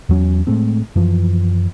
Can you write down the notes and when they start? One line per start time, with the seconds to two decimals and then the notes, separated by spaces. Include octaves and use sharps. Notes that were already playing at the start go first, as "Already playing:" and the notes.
0.09 E2 F#3 C#4
0.47 A2 G#3 A3 C4
0.96 F#2 E3 F3